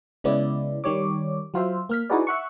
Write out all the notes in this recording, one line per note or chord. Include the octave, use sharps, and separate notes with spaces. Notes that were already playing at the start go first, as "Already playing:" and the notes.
C#3 G#3 B3 E4 D5
D#3 G3 C#5 D6
F#3 F4 C5 E5
A#3 F6 B6
D#4 E4 F#4 G#4 B4 D5
E5 F#5 C#6